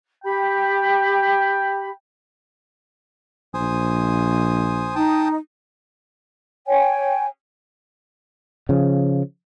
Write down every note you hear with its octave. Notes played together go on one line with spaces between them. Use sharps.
G4 G5 B5
A#1 C5 G#5 D#6
D#4 G5 A5 D#6
C#5 G5 G#5
C#3 F3